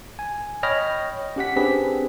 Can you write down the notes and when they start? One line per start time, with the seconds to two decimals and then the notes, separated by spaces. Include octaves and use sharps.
0.19 G#5
0.63 C#5 D#5 G5 B5 F6 A#6
1.36 C#4 G4 F#5 B6
1.56 C4 D4 G4 G#4 B4 B6